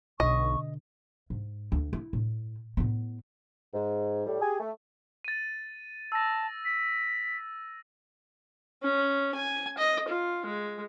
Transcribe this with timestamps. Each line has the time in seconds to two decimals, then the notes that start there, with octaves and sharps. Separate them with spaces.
0.20 B1 B2 D3 D#5 C#6
1.30 G#2
1.72 D2
1.93 E4
2.13 A2
2.77 A2 B3
3.73 G#2
4.26 A2 G3
4.41 G4 G#4 G#5
4.60 A3
5.25 A6 D#7
6.12 A5 E6 A#6
6.64 B6
8.82 C#4
9.35 G#5
9.78 D#5
10.09 F4
10.45 G#3